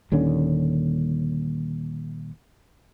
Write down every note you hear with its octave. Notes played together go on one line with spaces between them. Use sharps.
D#1 D#2 D3 C#4